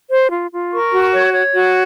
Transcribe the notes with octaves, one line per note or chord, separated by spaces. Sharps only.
C5
F4
F4
A#4 C#6
F#4
C#5
C#5
F#4